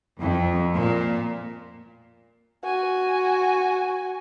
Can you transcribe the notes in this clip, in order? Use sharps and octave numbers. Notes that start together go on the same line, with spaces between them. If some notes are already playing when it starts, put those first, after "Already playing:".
F2
A#2
F#4 G#5